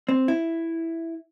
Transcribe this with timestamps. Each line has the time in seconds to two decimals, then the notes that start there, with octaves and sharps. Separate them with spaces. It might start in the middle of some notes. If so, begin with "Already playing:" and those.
0.09 C4
0.28 E4